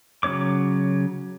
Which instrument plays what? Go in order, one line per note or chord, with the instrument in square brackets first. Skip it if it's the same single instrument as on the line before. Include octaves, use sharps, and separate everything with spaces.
[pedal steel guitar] C#3 F#3 C#4 C#5 D6